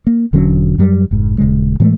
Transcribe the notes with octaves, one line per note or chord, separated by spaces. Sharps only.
A#3
E1 D3 F#3 C#4
F#2 F#3 G3
F1 G#2
D#1 C#3 G#3
A2 E3 G#3 A3